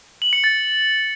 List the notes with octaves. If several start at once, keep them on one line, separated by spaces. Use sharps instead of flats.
F#7
C#7
A6